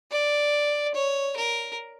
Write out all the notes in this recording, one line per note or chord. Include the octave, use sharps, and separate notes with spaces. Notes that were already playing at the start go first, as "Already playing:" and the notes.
D5
C#5
A#4